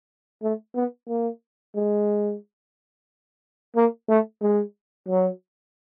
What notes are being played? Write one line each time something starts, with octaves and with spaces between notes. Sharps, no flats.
A3
B3
A#3
G#3
A#3
A3
G#3
F#3